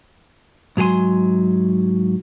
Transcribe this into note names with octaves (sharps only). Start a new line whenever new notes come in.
G#2 F#3 A4 G#5 C6